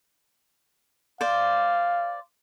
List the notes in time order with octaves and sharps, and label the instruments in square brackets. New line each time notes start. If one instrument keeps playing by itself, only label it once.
[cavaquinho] C5 D5 [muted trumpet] F5